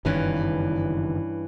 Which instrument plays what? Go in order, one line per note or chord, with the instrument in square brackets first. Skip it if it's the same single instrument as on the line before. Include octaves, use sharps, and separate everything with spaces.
[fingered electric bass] F#1 D#3 [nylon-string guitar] G2 E3 C#4